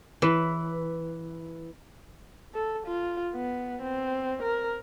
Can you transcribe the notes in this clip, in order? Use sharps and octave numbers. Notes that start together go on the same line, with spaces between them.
E3 E4 B4
A4
F4
B3
C4
A#4